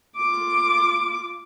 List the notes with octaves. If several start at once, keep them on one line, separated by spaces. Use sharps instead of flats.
F4 D6